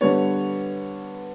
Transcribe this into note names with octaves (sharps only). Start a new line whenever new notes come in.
D3 G3 B3 C#5